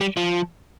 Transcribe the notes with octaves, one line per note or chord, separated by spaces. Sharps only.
G3
F3